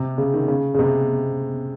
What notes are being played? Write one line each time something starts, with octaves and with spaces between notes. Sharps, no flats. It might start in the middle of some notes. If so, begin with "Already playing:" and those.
Already playing: C3
C#3
D#3
C#3
C#3
C3